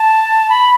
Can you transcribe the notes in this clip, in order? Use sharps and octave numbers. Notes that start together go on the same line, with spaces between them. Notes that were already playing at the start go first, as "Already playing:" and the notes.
Already playing: A5
B5